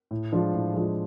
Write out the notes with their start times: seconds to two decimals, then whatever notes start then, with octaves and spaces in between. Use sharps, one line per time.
0.11 A2
0.32 F3 G#3 D4 F4
0.54 A2
0.74 F3 G#3 D4 F4